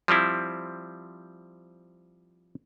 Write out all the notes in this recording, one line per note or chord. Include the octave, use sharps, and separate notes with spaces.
F3 G3 C4 E4